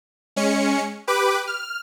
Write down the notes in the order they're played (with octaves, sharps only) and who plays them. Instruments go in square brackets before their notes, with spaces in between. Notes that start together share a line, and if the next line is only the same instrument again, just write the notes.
[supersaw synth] G#3 C#4 C#7
G4 B4 D6
F6